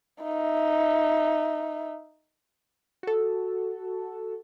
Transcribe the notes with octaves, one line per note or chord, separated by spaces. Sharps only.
D#4 E5
F#4 A4